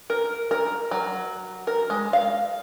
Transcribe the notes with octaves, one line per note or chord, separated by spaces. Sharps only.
A#4
A#4
F#3
A#4
G#3
F5